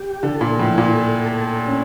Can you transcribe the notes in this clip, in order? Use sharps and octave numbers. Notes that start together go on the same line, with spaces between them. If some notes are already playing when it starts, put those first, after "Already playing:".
Already playing: G4
D3 A4
A#2
A2 F3
A#2
A4
A4
C#4